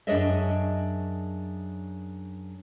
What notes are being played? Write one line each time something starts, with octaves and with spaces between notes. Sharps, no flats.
F#2 D4 G#4 C#5 D#5 E5